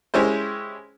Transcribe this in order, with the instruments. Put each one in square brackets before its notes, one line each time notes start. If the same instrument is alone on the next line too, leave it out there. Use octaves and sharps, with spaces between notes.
[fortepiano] G#3 C#4 E4 G4 C5